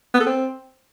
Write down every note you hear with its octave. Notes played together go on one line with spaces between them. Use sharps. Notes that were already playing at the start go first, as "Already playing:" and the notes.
B3
A4
C4